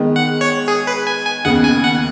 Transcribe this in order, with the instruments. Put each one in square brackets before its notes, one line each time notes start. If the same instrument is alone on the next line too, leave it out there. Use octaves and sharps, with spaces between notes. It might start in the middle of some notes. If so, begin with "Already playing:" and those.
Already playing: [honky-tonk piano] D#3 G#3 B3
[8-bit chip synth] F#5
C#5
G#4
B4
G#5
G#5
[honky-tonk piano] D#2 C#3 B3 [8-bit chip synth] F#5
[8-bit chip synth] G#5
F#5